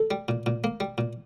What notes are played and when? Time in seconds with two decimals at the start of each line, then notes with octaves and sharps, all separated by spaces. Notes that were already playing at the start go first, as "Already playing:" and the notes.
Already playing: A4
0.11 G3
0.28 A#2
0.46 A#2
0.64 A#3
0.80 G3
0.98 A#2